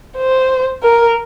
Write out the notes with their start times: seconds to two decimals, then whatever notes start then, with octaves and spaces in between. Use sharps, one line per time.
0.17 C5
0.83 A#4